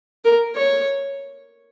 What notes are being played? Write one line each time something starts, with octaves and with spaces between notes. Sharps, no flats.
A#4
C#5